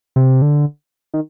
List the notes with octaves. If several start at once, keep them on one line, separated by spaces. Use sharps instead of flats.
C3
D3
D#3